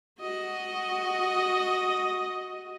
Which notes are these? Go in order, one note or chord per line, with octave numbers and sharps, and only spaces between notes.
F#4 D#5